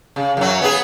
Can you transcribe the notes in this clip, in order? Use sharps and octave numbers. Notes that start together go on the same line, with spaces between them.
C#3
F#2 F#3
B3 G#4